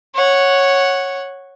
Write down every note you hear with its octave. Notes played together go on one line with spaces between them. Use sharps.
C#5 F#5